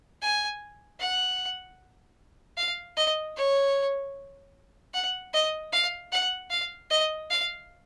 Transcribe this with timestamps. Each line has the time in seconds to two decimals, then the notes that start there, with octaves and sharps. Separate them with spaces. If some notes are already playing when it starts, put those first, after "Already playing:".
0.22 G#5
0.99 F#5
2.57 F5
2.97 D#5
3.37 C#5
4.94 F#5
5.33 D#5
5.73 F5
6.12 F#5
6.50 F5
6.90 D#5
7.30 F5